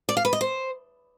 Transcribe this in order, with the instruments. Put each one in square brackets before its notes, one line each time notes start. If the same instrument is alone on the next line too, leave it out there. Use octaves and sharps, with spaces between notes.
[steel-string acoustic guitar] D5
F5
B4
D#5
C5